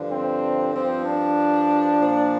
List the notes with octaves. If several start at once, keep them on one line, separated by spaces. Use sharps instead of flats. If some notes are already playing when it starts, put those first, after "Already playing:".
Already playing: G2 D3 F3
C4
G2 F3 C4
D4
A#2 F3